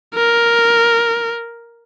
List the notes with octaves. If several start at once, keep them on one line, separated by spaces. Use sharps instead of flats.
A#4